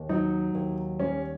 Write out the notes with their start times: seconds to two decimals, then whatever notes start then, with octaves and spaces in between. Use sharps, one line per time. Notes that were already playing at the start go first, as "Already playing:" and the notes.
Already playing: D#2
0.09 F#3 D#4
0.55 D#2
0.99 G3 C#4